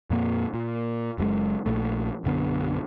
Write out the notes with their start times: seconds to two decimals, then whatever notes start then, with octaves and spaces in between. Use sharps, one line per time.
0.10 F2 A#2 A#3
0.54 A#2
1.18 F#1 F#2 A2 G#3
1.66 A#1 A#2 A3
2.24 B1 F#2 D3 B3